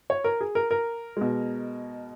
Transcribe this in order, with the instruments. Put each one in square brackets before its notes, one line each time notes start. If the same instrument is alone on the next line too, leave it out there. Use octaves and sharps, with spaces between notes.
[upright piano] C#5
A#4
G#4
A#4
A#4
B2 G#3